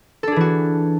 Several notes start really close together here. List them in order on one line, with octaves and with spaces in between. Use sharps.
A4 D4 G#4 E3 F#4